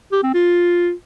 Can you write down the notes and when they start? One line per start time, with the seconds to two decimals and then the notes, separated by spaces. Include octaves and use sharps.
0.12 G4
0.23 C4
0.34 F4